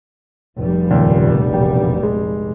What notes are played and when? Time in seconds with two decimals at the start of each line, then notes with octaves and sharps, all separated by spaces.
0.59 F1 A#1 G3
0.90 F#1 D#2 A#2
1.52 E1 G5
2.03 G#3